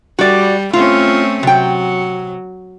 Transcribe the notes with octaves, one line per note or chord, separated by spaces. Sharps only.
G3 F#4 D5
A3 C4 C#4 F4
C3 F#3 G5